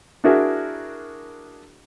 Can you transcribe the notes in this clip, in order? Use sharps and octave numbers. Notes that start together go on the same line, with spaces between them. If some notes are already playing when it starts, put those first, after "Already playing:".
D4 E4 F#4 G#4 A#4 E5